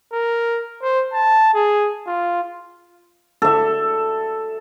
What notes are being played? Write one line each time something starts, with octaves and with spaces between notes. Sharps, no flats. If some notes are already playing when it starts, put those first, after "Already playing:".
A#4
C5
A5
G#4
F4
A4 E5